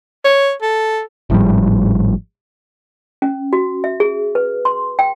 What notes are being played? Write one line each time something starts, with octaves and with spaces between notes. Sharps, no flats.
C#5
A4
G#1 A2 F3 G3
C#4
F#4
E5
G#4
B4
C6
G5